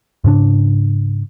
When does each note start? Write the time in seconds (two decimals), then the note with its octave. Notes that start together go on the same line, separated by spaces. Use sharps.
0.24 G#2 C#3 D4